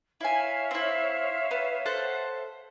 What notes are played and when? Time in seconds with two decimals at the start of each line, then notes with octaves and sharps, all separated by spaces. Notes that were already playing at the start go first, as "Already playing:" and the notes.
0.21 E4 C#5 E5 F5 G#5
0.71 C4 E4
1.51 B3
1.86 A4 C5 F#5